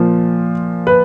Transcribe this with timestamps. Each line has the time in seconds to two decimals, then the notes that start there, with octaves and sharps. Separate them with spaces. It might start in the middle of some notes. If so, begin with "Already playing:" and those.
Already playing: A#2 F3
0.87 B4